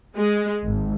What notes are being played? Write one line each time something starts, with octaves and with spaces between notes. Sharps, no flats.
G#3
G#1